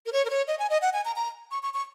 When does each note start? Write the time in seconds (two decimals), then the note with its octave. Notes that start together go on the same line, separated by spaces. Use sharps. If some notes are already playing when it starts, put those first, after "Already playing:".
0.06 A#4
0.13 C#5
0.25 A#4
0.30 C#5
0.47 D#5
0.59 G#5
0.70 D#5
0.82 F#5
0.93 G#5
1.05 A#5
1.16 A#5
1.51 C#6
1.63 C#6
1.74 C#6